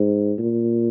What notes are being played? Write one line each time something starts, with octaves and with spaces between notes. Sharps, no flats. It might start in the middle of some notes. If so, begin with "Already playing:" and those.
Already playing: G#2
A#2